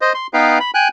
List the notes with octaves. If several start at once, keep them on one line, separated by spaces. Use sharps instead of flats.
C5 D#5
C6
B3 D#4 B4 F5 G5
B5
G5 G#5 F#6